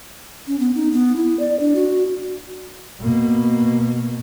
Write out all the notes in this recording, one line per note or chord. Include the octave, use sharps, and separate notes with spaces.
C#4
B3
D#4
B3
E4
D5
D4
F#4
B2 A#3